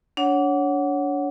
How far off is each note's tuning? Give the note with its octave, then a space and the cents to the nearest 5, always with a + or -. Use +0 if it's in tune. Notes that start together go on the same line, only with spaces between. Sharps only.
D4 -30 C#5 +0 F#5 +0